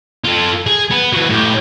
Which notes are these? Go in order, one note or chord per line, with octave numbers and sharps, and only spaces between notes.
F4 A4
G#4
B3
E3 F#3
A2 G4